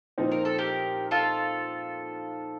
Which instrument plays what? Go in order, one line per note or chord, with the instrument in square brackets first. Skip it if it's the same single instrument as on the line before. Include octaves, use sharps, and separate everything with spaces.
[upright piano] A#2 F3 C4 D#4
[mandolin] A#4
A4
G4 A#4
F4 A4